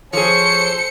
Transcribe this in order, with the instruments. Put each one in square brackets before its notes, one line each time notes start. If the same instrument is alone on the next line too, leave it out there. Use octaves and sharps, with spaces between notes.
[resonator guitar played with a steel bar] F3 G#4 [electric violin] A4 C5 [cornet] C#5 [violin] C#7